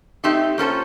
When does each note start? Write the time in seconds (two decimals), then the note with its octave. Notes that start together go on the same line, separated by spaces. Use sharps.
0.24 A3 C4 D#4 G4
0.58 A#3 C#4 F4 A4 C5